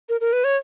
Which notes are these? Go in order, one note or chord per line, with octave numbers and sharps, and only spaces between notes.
A#4
A#4
B4
C#5